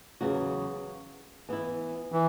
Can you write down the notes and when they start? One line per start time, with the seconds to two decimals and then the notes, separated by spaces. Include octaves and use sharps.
0.21 E2 C#3 F#3 B3 F#4
1.49 E3 B3 E4
2.12 E3